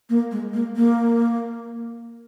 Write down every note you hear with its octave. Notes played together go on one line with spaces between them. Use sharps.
A#3
G#3
A#3
A#3